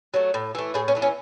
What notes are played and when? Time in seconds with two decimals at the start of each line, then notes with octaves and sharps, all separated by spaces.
0.14 F#3 A3
0.34 A2
0.55 E3 A3
0.74 A2 G#4
0.88 C#4
0.95 E3 A3
1.02 C#4